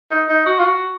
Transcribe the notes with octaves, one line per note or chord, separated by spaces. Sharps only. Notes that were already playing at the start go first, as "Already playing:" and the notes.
D#4
D#4
F#4
F4
F#4